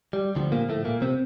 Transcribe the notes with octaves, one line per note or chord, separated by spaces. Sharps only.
G3
D2 D3 F3 G3
A#2 A#3
A2 A3
A#2 A#3
C3 C4